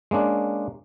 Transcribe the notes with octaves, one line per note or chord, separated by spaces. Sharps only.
G#3 A#3 C#4 D4